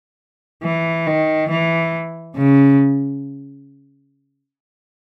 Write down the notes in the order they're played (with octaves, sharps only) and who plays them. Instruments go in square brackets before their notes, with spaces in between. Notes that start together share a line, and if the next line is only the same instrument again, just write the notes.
[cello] E3
D#3
E3
C#3